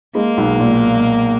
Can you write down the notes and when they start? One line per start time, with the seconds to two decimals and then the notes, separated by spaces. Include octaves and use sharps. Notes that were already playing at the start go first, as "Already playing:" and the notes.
0.15 G#3 A#3
0.37 B1
0.60 A#2